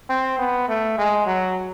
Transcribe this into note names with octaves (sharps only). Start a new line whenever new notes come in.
C4
B3
A3
G#3
F#3